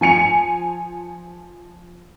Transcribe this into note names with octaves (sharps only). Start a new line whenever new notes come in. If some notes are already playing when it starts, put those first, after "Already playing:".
F3 G#5 C#7 F7